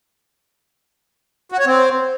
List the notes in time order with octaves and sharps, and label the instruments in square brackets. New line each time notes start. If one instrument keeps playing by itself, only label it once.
[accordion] F#4
C#5
C4